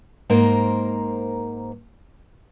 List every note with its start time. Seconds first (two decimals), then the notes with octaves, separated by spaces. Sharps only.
0.30 G#2 A#3 A#4 C5